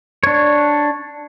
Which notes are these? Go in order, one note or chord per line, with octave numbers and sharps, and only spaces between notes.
D4 C#5